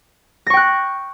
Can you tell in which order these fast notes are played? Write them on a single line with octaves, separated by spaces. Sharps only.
A#6 C#6 G5 F#6